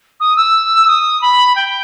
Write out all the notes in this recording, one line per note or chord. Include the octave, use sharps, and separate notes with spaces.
D#6
E6
D#6
B5
G5